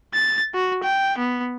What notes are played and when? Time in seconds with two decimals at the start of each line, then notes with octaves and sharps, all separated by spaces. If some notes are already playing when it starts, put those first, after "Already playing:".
0.14 A6
0.54 F#4
0.84 G5
1.18 B3